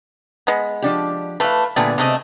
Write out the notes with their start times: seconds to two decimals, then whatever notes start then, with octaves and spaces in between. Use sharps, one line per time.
0.47 G#3 B3
0.82 F3 D4 G4
1.40 E3 A3 B4 F5
1.76 A#2 D3 G3 A3 B3 G#4
1.98 C3 G#3 A3 C4 D#5